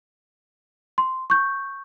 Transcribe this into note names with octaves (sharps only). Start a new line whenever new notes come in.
C6
C#6 G6